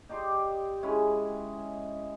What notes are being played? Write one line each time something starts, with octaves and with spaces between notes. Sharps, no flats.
D#4 G4 D5 C6
G#3 C#4 E4